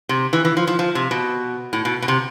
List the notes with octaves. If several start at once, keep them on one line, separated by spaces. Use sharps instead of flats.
C3
E3
E3
F3
F3
F3
C3
B2
A2
B2
B2
C3